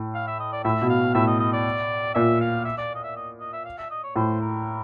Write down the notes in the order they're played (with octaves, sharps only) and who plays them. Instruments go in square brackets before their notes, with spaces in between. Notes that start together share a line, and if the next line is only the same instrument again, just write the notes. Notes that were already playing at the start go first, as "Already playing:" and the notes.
Already playing: [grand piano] A2
[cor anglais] F5
E5
D#5
D5
[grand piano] A2 [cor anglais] E5
[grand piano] B2
[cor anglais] F5
[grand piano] A2 [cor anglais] E5
[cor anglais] D#5
D#5
D5
[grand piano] A#2 [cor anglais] E5
[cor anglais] F5
E5
D5
D#5
E5
D#5
D#5
E5
F5
E5
D#5
C#5
[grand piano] A2 [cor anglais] C5
[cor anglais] A#4